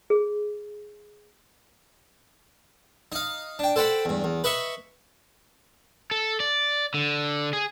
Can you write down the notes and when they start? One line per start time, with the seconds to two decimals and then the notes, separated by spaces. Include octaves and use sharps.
0.10 G#4
3.12 D#4 F5
3.59 D4 G5
3.76 A4 C5 F#5 G5 B5
4.05 E2 G2
4.24 E2
4.44 B4 D#5 E5 C#6
6.11 A4
6.40 D5
6.94 D3
7.53 G#4